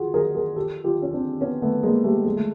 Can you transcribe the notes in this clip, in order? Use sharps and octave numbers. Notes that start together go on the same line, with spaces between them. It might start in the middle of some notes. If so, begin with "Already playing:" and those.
Already playing: F4 F#4 G#4
G#4 A#4
G#4 A#4
G4 A4
F4 G4
C#4
C4 D4
B3 C#4
A3 B3
G#3 A#3
G3 A3
G#3
A3